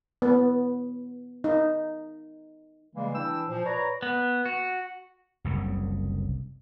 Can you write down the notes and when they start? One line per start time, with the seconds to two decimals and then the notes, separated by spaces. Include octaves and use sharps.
0.22 B3
1.44 D#4
2.93 C#3 E3 G3 G#3 A#3
3.14 E3 D4 E4 G5 E6
3.46 A#2 F3
3.65 B4 C#5 D5 A#5
4.02 B3
4.46 F#4
5.44 F#1 C2 C#3